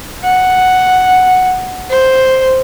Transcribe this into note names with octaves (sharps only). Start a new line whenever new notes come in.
F#5
C5